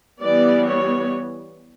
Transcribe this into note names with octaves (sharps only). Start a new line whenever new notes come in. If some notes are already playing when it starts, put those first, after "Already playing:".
E3 G3 B3 D5
C#5